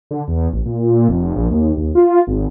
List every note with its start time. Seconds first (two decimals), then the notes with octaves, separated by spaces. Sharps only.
0.11 D3
0.28 E2
0.53 A1
0.66 A#2
1.09 F1
1.35 A#1
1.51 D#2
1.77 D#2
1.95 F4
2.27 G#1